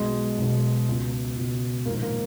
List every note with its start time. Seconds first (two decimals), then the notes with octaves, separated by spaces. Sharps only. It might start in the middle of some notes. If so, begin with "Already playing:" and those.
Already playing: B1 B2 G#3
0.38 B1 B2
0.88 C#2 B2
1.37 C#2 B2
1.86 A#1 G#2 D#3 A#3
2.02 A#3